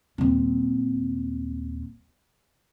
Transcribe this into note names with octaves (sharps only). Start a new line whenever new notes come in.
D#1 C4